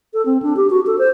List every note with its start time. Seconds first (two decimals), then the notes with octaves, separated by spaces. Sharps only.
0.14 A4
0.26 C4
0.42 D4
0.57 G4
0.70 F#4
0.87 A4
0.98 C5